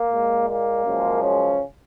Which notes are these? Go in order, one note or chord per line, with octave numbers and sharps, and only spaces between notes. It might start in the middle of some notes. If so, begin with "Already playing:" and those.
Already playing: A#3
A#2 G#3
A#3
F#2 C#3 F3 G#3
C#3 C#4